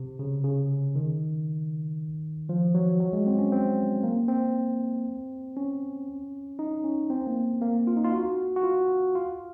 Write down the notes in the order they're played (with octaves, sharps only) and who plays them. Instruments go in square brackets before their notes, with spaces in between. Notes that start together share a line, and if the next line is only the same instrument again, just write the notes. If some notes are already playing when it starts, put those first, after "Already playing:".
Already playing: [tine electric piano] C3
C#3
C#3
D#3
F3
F#3
F#3
G#3
C4
C#4
C4
A#3
C4
C#4
D#4
C#4
C4
A#3
A#3
F4
D#4
F4
F#4
F#4
F4
F4